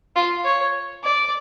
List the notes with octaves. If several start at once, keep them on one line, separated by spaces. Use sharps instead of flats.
F4
C#5
D5